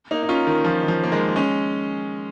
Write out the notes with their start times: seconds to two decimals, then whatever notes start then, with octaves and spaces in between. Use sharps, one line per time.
0.11 A#3 D#4
0.23 D#4
0.29 C#4 F4
0.47 D#3
0.65 F3
0.83 D#3
0.88 F3
1.04 A#3
1.12 D#3 G#3
1.28 A#3
1.36 G#3 C#4